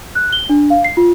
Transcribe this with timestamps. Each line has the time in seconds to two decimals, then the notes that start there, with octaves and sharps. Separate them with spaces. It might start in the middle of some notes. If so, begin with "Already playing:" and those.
0.15 F#6
0.33 G7
0.49 D4
0.70 F5
0.84 C7
0.97 F4